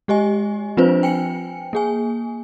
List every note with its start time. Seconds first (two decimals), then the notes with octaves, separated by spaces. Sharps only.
0.08 G#3 G4 D#5 G#5
0.77 F3 C4 D4 F4 B4 C5
1.03 G5 G#5 C#7
1.73 A#3 G#4 G#5